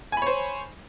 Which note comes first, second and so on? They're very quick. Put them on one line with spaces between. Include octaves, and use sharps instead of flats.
G#5 B5 C#5 C5